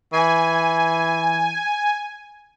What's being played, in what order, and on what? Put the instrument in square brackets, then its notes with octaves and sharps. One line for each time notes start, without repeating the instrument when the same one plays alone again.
[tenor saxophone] E3 [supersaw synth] G#5